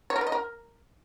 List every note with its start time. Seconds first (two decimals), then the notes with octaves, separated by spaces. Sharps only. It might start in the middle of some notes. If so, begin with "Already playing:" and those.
0.10 C#5
0.16 A#4
0.21 B4
0.27 D#5
0.32 A#4